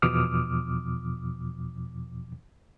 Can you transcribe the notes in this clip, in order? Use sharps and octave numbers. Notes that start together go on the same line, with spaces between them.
E2 B2 F3 D6 D#6 F6